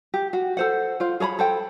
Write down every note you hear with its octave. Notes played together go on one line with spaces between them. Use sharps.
G4
F#4
A4 C5 F#5
F4 C5
G#4 C#5 A#5 B5
A4 C5 G5